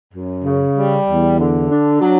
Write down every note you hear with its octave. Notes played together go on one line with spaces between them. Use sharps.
F#2
C#3
G3
E2
D3
D4
F#3